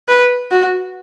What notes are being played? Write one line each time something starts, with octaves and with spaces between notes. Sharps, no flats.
B4
F#4